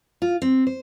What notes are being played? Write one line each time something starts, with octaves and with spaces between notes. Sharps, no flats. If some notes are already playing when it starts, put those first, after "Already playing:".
F4
C4
C5